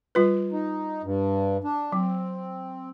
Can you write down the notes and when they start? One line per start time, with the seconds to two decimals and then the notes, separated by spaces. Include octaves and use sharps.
0.15 G3 F4 B4
0.52 D#4
1.03 G2
1.64 D4
1.92 F#3 C4